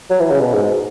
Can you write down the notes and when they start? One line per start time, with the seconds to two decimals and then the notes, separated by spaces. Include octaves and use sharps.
0.10 F#3
0.20 E3
0.31 C#3
0.41 B2
0.54 G#2